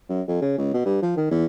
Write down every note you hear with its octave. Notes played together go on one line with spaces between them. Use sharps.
F#2
F2
C#3
C#2
B2
G2
F3
D#3
E2